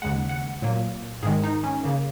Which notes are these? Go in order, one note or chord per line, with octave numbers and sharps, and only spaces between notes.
D#2 C#3 G#3 F#5
F#5
A#2 F#3 A#3
G#2 D#3 G#3 G#4
D#4
C#4
C#3 A#3